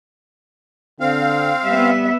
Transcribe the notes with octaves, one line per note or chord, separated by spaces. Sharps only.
D3 C4 F5
G3 B3 E5